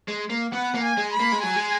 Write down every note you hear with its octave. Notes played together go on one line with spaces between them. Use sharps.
G#3
A#3
B3 F#5
A#3
G#5
G#3
B5
A#3
G#3
F#3 G#5
G#3